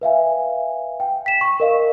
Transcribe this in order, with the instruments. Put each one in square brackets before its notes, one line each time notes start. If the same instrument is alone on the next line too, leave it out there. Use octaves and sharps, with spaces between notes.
[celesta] B4 E5 F5 G#5
G5
B6 E7
C#6
A#4 D#5 F5